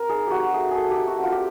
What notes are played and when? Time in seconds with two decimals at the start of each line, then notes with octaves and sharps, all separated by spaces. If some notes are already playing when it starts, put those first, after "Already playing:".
Already playing: C4 A#4
0.09 D#4 G#4
0.27 C4 F#4 G4
0.53 A3 G#4
0.71 A3 G#4 A4
0.91 G4
0.96 D#4
1.07 F#4
1.18 C4
1.23 F4
1.32 G4